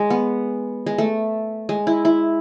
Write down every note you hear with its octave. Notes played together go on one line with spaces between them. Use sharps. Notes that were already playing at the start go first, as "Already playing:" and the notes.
Already playing: G#3
B3
G#3
A3
G#3
E4
E4